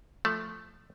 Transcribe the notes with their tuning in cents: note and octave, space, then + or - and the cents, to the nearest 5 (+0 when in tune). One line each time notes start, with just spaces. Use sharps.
F3 +0 A3 +0 A5 +0